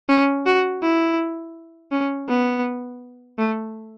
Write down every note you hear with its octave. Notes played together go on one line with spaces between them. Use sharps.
C#4
F#4
E4
C#4
B3
A3